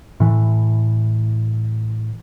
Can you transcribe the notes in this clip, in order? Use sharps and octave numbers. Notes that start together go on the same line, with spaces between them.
A2 E3